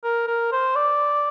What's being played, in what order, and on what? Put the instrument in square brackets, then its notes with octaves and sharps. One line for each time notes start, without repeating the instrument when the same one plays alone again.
[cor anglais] A#4
A#4
C5
D5